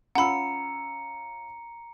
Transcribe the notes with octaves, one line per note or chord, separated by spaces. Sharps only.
C#4 F4 F#5 A#5 B5 E6 C#7